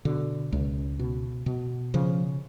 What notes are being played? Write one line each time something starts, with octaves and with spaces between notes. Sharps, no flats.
B2 D3
C#2
B2
B2
C#3 F3